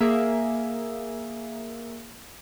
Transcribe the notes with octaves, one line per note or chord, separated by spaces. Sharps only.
A#3 G#4 E5